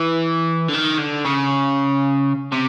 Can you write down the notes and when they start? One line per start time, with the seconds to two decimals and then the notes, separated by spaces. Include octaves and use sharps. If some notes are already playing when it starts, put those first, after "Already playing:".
Already playing: E3
0.69 D3
0.74 D#3
0.99 D3
1.25 C#3
2.52 C3